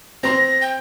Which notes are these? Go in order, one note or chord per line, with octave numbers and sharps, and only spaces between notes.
C4 C6 A#6
G5